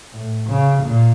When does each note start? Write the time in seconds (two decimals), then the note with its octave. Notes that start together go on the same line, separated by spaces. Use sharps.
0.14 A2
0.48 C#3
0.83 A#2